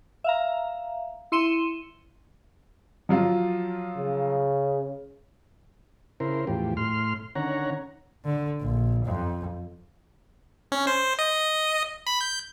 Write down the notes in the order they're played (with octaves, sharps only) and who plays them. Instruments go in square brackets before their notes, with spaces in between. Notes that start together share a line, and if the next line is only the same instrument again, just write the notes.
[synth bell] E5 F5 A#5
E4 C6 C#7 D#7 E7 G7
[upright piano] F3 F#3 F4
[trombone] C#3
[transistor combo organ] C#3 E4 A#4 C5
E2 A2 F3 G4
A2 C6 F6
D3 D#3 C#4 C#5 F#5 A#5
[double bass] D3
A#1
F2
[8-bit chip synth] C#4
C5
D#5
B5
G6